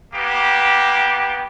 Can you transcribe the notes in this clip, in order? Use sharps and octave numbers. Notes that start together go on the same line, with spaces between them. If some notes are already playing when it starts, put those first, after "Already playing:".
A#3 B3 G4